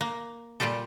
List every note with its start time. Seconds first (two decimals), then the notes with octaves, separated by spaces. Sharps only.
0.01 A#3
0.60 A#2 G3 F4 G4 A4